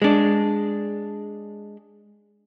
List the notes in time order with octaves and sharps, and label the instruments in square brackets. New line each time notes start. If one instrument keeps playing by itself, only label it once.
[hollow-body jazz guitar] G#3 D4